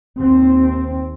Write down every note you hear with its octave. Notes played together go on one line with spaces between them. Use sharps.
D#2 C4